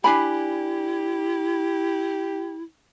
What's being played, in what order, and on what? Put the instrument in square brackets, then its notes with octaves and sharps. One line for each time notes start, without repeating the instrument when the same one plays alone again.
[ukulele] D4 G#5 B5 [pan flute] E4 [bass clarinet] G4